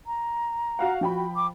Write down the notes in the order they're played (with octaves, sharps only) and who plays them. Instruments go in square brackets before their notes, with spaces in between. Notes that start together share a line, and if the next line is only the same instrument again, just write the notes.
[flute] A#5
[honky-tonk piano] F#4 F5 F#5
[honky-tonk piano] F3 G5 B5 [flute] F#4
[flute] D6